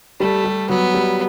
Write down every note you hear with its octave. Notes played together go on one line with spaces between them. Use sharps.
G3 A3
G3
F#3 B3
G3